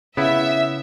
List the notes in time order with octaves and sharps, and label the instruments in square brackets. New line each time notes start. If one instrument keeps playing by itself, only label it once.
[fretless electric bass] C#3 [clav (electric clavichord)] B3 E4 [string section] E5